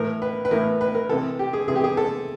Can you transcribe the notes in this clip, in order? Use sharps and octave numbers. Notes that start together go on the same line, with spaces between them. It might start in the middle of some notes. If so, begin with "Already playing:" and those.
Already playing: A2 E3 A#4
B4
B4
A2 E3 A#4
B4
A#4
C3 E3 A4
G4
G#4
C3 E3 G#4
G4
G#4
A4